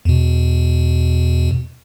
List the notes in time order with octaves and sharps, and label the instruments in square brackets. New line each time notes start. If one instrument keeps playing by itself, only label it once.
[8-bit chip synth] E2 B2